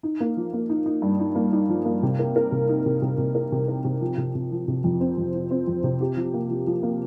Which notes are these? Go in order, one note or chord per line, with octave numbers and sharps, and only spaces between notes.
D#4
A#3
F3
A#3
D#4
D#4
G2
D#4
A#3
D#4
F3
A#3
C3
A#4
A#4
C3
D#4
C3
C3
C3
A#4
C3
A#4
C3
F3
C3
C3
F3
C3
F2
C4
F2
F3
C4
F2
C3
G4
F3
A#3
F3
F3
A#3